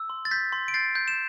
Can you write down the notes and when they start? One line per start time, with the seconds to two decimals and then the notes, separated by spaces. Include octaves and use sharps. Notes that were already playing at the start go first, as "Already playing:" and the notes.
Already playing: E6
0.10 C6
0.25 A6
0.31 G6 B6
0.52 C6
0.68 D7
0.74 G6 A6 C7
0.95 G6
1.08 E7